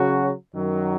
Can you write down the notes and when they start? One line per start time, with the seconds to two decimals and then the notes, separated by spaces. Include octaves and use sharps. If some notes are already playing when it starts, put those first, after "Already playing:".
Already playing: C#3 F#3 C#4 F#4
0.53 F#2 D#3 F#3